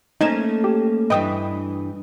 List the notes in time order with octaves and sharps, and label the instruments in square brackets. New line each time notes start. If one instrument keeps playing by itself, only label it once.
[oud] A3 A#3 C#4 [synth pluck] D#4 G#6 E7
[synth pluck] G4
[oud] G2 E3 B4 [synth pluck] D#5 G5 D#6